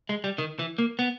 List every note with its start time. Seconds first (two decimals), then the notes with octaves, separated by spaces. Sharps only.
0.09 G#3
0.24 G3
0.38 D#3
0.59 E3
0.78 A#3
0.99 B3